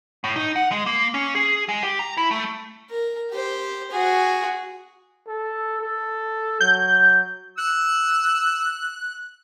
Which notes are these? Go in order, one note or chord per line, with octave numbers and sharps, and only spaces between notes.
A2
D#4
F#5
G#3
A#3
C#4
G#4
G#3
G4
A#5
E4
A3
A#4
G4 C5
F#4 G#4
A4
A4
F#3 G6
E6 F#6